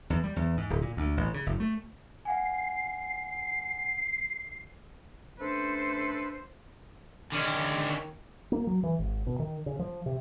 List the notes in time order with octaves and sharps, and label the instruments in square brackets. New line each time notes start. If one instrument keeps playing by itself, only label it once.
[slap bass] E2
G3
E2
G#2
D1
A#2
D2
A1
C#3
F#1
A3
[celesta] F5 F#5 G#5 [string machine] C7
[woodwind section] A3 C#4 D4 A4 B4 C5
[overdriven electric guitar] D3 C#4 [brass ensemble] D#3
[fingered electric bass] A#3
F#3
E3
G#1
B2
D#3
C#3
F3
C3